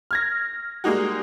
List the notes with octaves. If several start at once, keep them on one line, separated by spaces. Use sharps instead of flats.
F6 G#6 A#6
G3 G#3 A#3 D#4 F#4